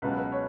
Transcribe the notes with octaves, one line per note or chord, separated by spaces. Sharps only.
C#2 B2 F#3 B4
B4
C#5